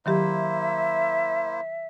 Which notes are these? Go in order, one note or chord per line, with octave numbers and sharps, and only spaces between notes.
D#3 F#3 A#3 E4 G4 C5 E5